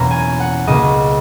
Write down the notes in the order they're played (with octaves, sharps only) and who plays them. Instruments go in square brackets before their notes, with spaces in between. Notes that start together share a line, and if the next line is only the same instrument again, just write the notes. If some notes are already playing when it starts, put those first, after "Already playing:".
Already playing: [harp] E2 B2 A#3 C#4 A#5
G#5
F#5
C#2 B2 A#3 D#5